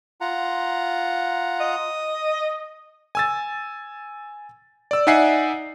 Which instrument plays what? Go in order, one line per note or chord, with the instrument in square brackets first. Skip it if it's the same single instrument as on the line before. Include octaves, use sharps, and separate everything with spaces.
[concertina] F4 F#5 A#5
[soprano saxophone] D#5
[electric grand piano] G#5 E6 A6
D5 E6
D#4 D5 E5 F#5 G#5 C7